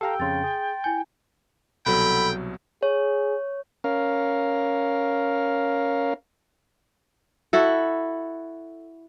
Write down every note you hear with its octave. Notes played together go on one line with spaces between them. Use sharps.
G4 A4 F5 G5 A#5 E6
F2 C#3 C6 A6
G#4
E4 G#5 G6
C2 B2 F#3 A4 G5 B5
G#4 C#5
C#4 A#4 F5
E4 F#4 A4